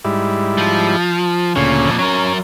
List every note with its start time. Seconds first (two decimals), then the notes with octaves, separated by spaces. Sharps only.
0.04 G#2 G3 E4
0.58 F3
1.56 D2 A#2 C#3 C#4
1.85 F2 A#2
1.99 F#3 C#4 A#4